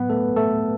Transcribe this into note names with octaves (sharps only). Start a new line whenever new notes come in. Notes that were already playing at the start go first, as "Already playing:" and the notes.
Already playing: A2 F#3 B3 B4
A3 A4
A3 A4